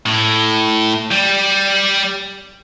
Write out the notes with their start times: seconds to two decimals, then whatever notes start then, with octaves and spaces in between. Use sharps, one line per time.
0.06 A2
1.11 G3